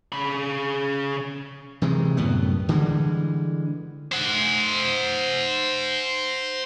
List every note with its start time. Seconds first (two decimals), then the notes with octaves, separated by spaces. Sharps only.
0.12 C#3 B5
1.82 C3 D#3 E3 G#3
2.17 C2 F#2 A2 B3
2.69 D3 E3 G3 G#3
4.12 C5 F#5